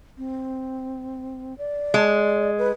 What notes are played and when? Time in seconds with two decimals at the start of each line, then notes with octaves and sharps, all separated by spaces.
0.18 C4
1.58 D5
1.94 G#3
2.58 B4